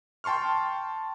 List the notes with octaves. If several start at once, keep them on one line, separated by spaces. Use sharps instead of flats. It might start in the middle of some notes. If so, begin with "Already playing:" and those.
G5 A5 C6 C#6 F6